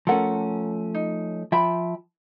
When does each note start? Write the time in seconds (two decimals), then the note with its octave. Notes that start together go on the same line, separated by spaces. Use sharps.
0.07 F3 A3 C#4 A4 A#4 F#5
0.94 D#4
1.52 F3 E5 G5 B5